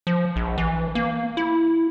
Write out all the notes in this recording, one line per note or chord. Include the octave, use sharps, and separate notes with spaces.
F3
A#1
E3
A#3
E4